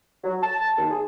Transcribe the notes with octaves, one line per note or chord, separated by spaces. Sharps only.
F#3
A5
D#2
G#4